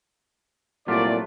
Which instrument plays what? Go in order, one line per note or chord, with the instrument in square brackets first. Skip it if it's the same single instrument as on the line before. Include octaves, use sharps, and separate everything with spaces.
[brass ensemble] C2 D5 [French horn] A#2 [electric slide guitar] F#3 A3 F4